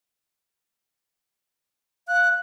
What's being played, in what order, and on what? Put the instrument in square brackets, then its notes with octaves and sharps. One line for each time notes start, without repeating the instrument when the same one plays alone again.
[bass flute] F5 [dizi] F#6